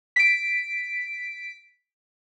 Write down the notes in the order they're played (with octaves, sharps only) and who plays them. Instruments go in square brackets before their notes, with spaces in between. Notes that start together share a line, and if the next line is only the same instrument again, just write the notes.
[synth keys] B6 D7